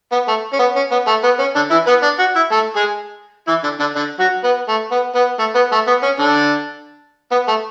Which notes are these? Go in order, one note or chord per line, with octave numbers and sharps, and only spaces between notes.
B3
A3
C#4
B3
C#4
B3
A3
B3
C#4
D3 D4
E3 E4
B3 B4
D4 D5
F#4 F#5
E4 E5
A3 A4
G#3 G#4
E3 E4
D3 D4
D3 D4
D3 D4
F#3 F#4
B3
A3
B3
B3
A3
B3
A3
B3
C#4
D3 D4
B3
A3